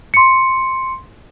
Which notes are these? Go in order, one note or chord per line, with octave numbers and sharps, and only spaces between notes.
C6 C#7